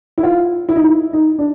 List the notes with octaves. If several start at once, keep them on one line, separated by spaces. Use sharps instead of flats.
E4
F4
E4
D#4
E4
D#4
D4